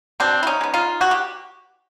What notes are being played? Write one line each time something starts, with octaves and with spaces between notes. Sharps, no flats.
B2 C4 D4
E4
C#4 D#4
G#3 B3
D#4 F4
B2 F#4
G4